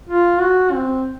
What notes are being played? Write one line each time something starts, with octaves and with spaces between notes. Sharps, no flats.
F4
F#4
C4